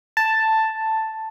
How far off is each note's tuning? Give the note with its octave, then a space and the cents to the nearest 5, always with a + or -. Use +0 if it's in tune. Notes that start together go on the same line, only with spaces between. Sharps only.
A5 +5